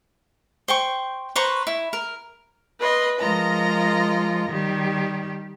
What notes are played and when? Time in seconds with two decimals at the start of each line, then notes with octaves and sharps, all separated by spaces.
0.68 C5 G5 C#6
1.36 B4 C5 A#5 C#6
1.67 E4
1.93 A#4
2.79 B4 D#5 C6
3.19 F3 G#3 F4 A#4 D#5 A#5
4.49 D#3 G3 G4